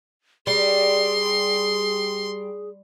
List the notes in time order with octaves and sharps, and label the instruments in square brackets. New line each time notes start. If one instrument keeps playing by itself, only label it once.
[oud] G3 [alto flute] G#4 [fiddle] C6